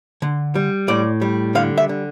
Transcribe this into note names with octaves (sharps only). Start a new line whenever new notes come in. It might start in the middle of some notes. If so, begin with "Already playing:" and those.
D3
G3
A2 D5
G3
D3 F5
E5
D3